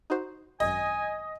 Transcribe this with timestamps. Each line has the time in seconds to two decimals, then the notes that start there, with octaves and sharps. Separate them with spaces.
0.10 D#4 F#4 C5
0.60 G#1 F#2 D#5 G#5